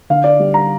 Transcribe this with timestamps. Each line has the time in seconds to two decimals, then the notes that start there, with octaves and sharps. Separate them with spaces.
0.10 D3 F5
0.24 D5
0.39 G3
0.54 A#5